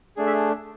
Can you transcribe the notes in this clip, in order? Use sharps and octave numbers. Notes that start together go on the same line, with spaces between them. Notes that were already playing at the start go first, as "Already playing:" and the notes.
A3 D4 G#4
E5